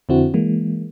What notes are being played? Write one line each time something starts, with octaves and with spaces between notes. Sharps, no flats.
F2 D3 C4 E4 F#4
E3 G#3 A#3